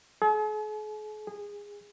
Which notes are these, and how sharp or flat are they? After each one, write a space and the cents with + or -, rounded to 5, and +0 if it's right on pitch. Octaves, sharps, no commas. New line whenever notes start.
G#4 +45
G#4 -20